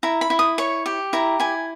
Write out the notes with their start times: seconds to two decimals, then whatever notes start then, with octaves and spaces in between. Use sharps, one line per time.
0.03 E4 A#5
0.21 B5
0.30 E4
0.39 D#6
0.58 C#5 C#6
0.86 G4
1.13 E4 A#5
1.40 E4 G#5